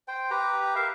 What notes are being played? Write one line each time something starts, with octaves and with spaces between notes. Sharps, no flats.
C5 G5
G4 B4 A#5
A#4 E5 F5